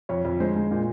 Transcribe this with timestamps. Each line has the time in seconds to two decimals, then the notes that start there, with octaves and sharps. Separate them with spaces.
0.09 F2 C#5
0.25 F2
0.40 G#3 C5
0.56 G#3
0.71 A#2